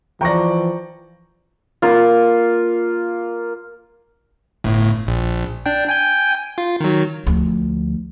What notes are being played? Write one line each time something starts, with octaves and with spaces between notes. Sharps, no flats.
E3 F3 D5 G5 A#5 C#6 A#6
A#3 F4
G1 A2
A#1
D4 G5
G5 G#5 G6
F4
D#3 F#3
D2 F3